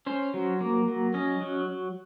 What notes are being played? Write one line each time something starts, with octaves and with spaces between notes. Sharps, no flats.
C#4 C5
F#3
A#3
F#3
C#4 D#5
F#3